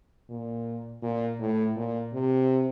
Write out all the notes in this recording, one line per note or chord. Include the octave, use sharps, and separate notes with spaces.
A#2
A#2
A2
A#2
C3